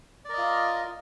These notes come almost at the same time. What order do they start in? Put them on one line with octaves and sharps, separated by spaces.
D5 A#4 D#5 F4